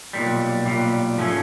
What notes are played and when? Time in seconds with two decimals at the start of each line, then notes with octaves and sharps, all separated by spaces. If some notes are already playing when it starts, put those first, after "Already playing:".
0.13 B1 A#2 G3
0.66 B1 A#2 G3
1.17 G#2 F3 A3 C#4